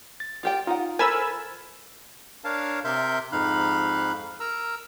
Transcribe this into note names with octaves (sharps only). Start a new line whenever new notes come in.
A6
F4 G4 G5
D#4 F4 F#5
F4 A4 A#4 C5 G#5 B5 E6 F6
D4 A#4 C#5 F5 A5
C3 A#4 E5 C6 G6
F2 G#2 D#4 F5 B5 F#6
A#4 A#5 E6